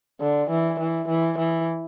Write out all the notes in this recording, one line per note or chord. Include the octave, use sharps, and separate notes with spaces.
D3
E3
E3
E3
E3